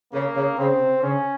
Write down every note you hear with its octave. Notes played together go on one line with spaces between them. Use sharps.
C#3 A#3
C#3
C#3 C4
C3
C#3 C#4